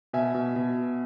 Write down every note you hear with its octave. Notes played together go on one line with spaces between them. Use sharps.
B2 E5 G#5
B2
B2